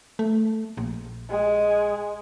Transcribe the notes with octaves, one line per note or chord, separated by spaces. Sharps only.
A3
A#1
G#3